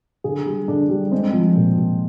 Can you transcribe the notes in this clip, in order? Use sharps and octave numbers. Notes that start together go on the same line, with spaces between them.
D3 G#4
G3
D3 D4
G3
G#3 C4
F3
A#2
A#2